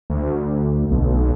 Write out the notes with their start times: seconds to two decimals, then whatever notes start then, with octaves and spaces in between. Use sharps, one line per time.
0.10 D2
0.91 B1